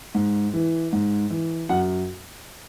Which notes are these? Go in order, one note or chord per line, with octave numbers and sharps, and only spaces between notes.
G#2
E3
G#2
E3
F#2 F#5